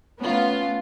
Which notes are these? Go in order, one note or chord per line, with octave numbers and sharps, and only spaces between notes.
A3 B3 C#4 F4